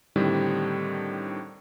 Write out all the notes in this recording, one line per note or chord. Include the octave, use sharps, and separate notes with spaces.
A2 D3 D#3 G3 C4